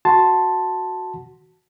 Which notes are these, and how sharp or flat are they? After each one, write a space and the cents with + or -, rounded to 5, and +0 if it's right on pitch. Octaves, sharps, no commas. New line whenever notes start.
F#4 +0 A5 +0 C6 +0